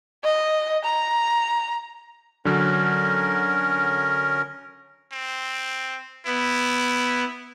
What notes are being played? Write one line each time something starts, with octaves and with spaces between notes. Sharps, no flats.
D#5
A#5
D3 F#3 C#4 A#4
C4
B3 E4